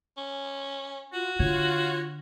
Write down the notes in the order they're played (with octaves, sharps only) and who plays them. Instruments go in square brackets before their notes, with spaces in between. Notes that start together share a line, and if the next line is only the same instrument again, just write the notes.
[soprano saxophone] C#4
[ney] F4 [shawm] F#4
[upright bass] D3 [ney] F4 [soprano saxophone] C#5